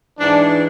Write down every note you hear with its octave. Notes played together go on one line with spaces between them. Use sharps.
G#2 E3 D4